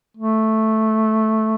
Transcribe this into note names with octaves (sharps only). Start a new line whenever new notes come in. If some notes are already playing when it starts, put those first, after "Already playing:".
A3